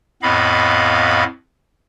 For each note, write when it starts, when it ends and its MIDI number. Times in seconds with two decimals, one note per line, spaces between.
0.22 1.24 41
0.22 1.24 45
0.22 1.24 59
0.22 1.24 75
0.22 1.24 77
0.22 1.24 83